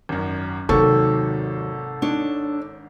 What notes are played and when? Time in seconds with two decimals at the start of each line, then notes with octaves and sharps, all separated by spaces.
0.09 G#1 F#2
0.69 G#1 D#2 G#2 C3 F#3 A4 C#6
2.02 D4 D#4 C#5